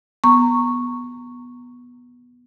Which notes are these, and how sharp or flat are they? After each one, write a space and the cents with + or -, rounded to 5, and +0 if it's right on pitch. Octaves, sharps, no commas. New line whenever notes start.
B3 -10 A#5 -20 C#6 -5